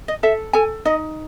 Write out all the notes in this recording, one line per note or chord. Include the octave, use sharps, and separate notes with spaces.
D#5
A4 E5
A4 G#5
D#4 D#5